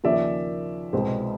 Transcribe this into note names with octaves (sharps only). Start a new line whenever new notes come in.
D#2 C#3 F3 A#3 C#4 D5 E5
C2 B2 G#3 C4